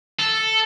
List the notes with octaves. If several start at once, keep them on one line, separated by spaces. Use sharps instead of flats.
A4